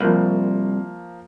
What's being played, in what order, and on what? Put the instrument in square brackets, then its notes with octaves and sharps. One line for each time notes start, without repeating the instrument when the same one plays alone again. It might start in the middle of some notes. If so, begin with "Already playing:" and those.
[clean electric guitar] C2 [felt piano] F3 A#3